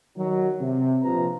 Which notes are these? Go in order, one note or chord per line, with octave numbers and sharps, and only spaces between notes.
D#3 F#3
C3
A#1 C3 F3 B4 A#5